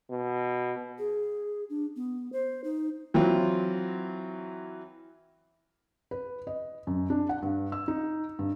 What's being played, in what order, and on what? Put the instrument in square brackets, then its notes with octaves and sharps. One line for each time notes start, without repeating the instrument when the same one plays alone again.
[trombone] B2
[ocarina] G#4
D4
B3
C5
D#4
[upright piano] E3 F#3 C4 F4
[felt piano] B4
D#5
F#2
D4
F#5
G2
E6
D#4
G2